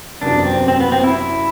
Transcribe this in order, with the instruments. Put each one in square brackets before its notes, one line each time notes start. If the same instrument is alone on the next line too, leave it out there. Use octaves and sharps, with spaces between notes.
[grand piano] F#1 E2 C3 F#3 [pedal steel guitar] D4
[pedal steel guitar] C4
C4
B3
C4
E4
E4